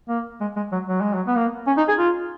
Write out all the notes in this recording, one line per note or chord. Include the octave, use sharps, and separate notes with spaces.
A#3
G#3
G#3
F#3
F#3
G#3
F#3
B3
A#3
C#4
D#4
G#4
F4